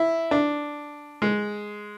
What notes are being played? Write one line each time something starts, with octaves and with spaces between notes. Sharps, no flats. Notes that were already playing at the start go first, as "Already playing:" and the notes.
Already playing: E4
D4
G#3